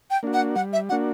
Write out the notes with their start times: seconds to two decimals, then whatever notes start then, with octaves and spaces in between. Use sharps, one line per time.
0.11 G5
0.23 A#3 D4 F#4
0.33 F#5
0.56 G3 F#5
0.73 E5
0.89 A#3 D4 F#4 F#5